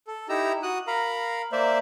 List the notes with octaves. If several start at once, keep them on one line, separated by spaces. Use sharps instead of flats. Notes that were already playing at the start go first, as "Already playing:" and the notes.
A4
D#4 E4 G4 A#5 E6
F#4 D#6 F#6
A#4 F5 A#5 B5
A#3 C5 D5 E5